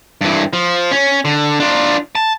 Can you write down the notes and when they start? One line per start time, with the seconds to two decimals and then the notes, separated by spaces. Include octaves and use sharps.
0.21 G2 E3
0.53 F3
0.91 C#4
1.25 D3
1.60 D4 F4
2.15 A5